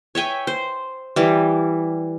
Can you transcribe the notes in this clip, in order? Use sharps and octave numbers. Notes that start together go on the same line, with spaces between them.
C#5 E5 G5 G#5
C5
E3 G3 E4